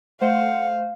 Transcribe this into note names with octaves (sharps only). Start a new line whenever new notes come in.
A3 C5 F5 F#5